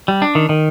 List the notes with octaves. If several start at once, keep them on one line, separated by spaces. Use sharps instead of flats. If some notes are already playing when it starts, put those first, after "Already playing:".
G3
D4
D#3
D#3